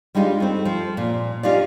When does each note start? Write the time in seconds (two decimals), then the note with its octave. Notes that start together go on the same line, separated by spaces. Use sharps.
0.15 G3 G#3 D4 D#4 F4
0.40 A3 C4
0.65 F3
0.97 A#2
1.43 C#4 D#4 F4 G4 D5